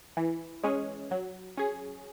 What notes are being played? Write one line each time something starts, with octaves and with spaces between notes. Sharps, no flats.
E3
G#3 C#4 G#4
F#3
C#4 G#4